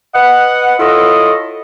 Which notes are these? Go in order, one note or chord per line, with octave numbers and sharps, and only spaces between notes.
B4 D#5 F#5
E4 F4 A4 C#5 D#5